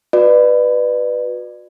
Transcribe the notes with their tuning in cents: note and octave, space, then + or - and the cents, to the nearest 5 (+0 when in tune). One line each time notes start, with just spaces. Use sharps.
F#4 -35 B4 +0 D5 +30